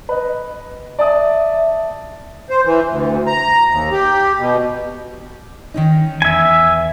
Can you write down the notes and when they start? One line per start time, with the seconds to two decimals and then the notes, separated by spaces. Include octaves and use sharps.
0.09 B4 D#5
0.99 D5 E5 A5 D#6
2.50 C5
2.65 E3
2.90 D2
3.27 A#5
3.70 D#2
3.92 G4
4.39 B2
5.74 D#3 C#4 D#4
6.22 E2 E5 G#5